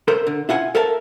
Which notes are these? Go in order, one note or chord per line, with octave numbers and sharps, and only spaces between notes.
A4 A#4 C5 E5
D3
E4 F4 F#5 G#5
A4 A#4 E5 F5 A5